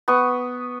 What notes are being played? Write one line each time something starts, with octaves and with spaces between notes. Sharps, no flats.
B3 C#6 D#6